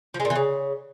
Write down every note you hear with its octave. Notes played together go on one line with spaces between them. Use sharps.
F3
G#3
A#2
E3
C#3